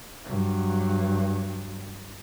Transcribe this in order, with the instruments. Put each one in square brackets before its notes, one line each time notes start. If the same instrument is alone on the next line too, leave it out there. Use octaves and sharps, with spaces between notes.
[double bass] G2 F#3